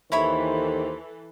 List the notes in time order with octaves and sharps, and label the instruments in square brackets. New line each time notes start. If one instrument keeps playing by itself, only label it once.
[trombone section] D#2 D#3 C5 [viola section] E3 A4 [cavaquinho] E4 C#5 B5